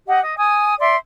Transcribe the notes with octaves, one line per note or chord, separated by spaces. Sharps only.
G4 D#5 F#5
D#5
G#5 D#6
D5 E5 C6